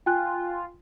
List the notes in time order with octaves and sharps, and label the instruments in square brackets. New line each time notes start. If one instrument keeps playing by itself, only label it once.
[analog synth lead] F4 [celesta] G5 G#5 F#6